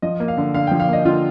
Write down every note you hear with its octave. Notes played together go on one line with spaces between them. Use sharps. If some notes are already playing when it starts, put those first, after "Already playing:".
F3 D#5
A#3
F5
D3
D3 F5
G5
F3
F5
A#3 D#5
D3 F4